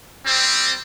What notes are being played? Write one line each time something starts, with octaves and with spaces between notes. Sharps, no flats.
G3 C4